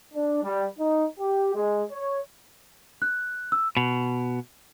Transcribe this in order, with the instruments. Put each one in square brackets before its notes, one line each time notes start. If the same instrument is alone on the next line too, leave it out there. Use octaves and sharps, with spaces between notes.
[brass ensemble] D4
G3
D#4
G4
G#3
C#5
[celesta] F#6
E6
[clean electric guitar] B2